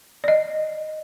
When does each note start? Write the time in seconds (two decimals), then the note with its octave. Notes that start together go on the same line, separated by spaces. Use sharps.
0.24 D5 D#5